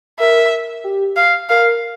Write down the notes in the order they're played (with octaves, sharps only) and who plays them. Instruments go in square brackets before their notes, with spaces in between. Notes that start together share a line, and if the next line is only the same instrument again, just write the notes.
[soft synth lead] A#4 [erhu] E5
[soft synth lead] G4
[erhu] F5
[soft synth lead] A#4 [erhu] F5